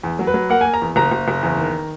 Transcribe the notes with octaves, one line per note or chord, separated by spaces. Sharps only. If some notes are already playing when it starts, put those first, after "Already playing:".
E2
F#3
B4
F#3
A#3 F#5
A#3 G#5
A#5
E2
F#1 A#5
F#1
F#1
E2
D#3